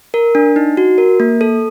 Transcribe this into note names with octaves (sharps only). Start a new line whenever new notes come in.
A#4
D4
D#4
F#4
A#4
A#3
A4